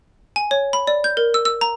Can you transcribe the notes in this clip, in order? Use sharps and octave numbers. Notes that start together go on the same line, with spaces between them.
G#5
C#5
B5
D5
G6
A#4
E6
E6
A#5